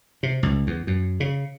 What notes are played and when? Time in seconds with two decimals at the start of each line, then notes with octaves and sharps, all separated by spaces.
0.23 C3
0.43 C#2
0.67 E2
0.87 F#2
1.20 C#3